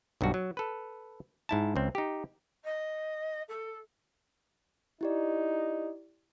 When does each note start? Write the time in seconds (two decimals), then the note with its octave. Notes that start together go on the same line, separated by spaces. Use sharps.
0.21 B1 G2 G3 F#4
0.34 F#3
0.57 A4 B4
1.49 G#2 E4 A5
1.76 C#2 C4
1.95 D#4 G4
2.64 D#5
3.48 A4
5.01 D#4 E4 G4 D5